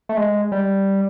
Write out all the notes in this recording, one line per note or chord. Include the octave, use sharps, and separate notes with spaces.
A3
G#3
G3